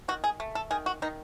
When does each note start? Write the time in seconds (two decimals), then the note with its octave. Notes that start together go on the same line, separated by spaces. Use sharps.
0.08 D#3 F#4
0.24 G#4
0.40 A3
0.55 A4
0.71 D#3 G#4
0.86 F#4
1.02 D#3 D#4